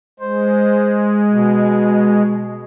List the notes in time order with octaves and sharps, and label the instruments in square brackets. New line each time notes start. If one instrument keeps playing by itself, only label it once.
[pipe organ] G#3 [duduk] C5
[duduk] B2